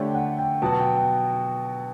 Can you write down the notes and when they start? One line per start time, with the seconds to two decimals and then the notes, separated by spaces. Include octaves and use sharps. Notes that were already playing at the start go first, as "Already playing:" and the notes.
Already playing: D3 A3 D4 G4 C#5 G5
0.14 F#5
0.39 G5
0.62 B2 F#3 B3 F#4 A5
0.79 G5
0.96 G5